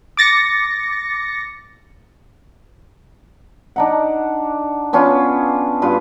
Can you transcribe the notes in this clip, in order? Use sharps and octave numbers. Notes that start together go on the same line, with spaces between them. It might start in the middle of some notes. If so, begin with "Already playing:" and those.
D6 A6 A#6 C#7
D4 D#4 F#5
B3 C#4 D4 F4
G2 F4 B4